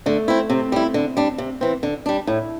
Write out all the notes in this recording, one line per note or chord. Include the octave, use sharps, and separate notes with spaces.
D3 A3
C4 E4
C3 C4
G3 E4
D3
G3 D4
C3
E3 C4
D3
G3 D4
A2 E4